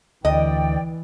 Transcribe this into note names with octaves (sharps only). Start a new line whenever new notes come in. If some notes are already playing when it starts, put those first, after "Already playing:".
D2 E3 D5 D#5 G5